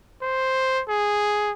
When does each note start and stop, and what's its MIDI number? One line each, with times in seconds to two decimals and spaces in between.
0.22 0.83 72
0.88 1.52 68